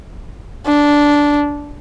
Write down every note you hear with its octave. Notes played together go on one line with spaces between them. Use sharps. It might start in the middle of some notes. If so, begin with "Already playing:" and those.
D4